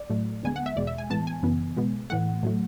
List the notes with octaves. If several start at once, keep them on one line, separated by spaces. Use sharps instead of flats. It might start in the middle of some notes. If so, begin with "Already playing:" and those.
Already playing: D5
A2 F#3 A3
D2 D3 G#3 B3 G#5
F#5
E5
E2 B2 G#3 D5
E5
G#5
A2 E3 G#3 B3 A5
G#5
F#2 C#3 E3 B3
B2 G#3 B3
A2 E3 A3 F#5
A2 F#3 A3